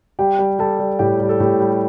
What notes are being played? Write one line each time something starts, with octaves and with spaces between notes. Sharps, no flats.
G3 G4 G5
G3
G3 A4 A5
G3
A2 G4 G5
G3
A4
A2 G4
G3